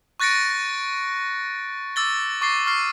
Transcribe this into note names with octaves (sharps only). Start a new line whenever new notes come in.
C#6 F#6 A6 A#6 C#7 D7
D6 E6 A6 G7
C#6 D6 A6 C7 G7
C#6 F6 C7